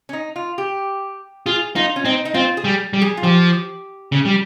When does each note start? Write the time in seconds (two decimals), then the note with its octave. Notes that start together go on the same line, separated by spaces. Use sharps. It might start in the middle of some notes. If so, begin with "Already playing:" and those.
0.09 C#4
0.13 D#4
0.36 F4
0.58 G4
1.46 F4 G#4
1.76 D#4 F4
1.96 C#4
2.05 C4 D#4
2.25 D#4
2.34 C4 F4
2.57 G#4
2.64 G3
2.93 G3
3.02 G#4
3.17 F4
3.23 F3 G4
4.12 C#3
4.25 G3